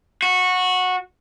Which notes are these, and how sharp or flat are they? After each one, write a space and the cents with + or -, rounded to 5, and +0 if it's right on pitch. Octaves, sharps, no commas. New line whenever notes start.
F#4 -15